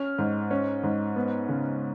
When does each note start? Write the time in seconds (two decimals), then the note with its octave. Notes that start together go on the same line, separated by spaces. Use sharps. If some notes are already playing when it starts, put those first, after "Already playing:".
Already playing: C#4 F6
0.18 G#2
0.51 C#4
0.83 G#2
1.16 B3
1.49 C#3